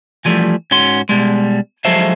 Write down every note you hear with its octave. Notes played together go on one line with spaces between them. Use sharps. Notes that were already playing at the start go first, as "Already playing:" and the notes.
E3 F3 G3 A3
G#2 C#4 F#4 C6
B2 G3 G#3
F3 F#3 G#3 A4 C5 E5